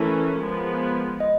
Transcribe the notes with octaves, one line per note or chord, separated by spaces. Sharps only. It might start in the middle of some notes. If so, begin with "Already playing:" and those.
Already playing: E3 A3 C#4 E4 A#4
F3 G#3 B3
D#5